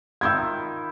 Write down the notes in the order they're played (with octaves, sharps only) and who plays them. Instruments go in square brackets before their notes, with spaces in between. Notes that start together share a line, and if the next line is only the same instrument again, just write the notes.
[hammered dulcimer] D#3 E4 F4 [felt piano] E6 G6 G#6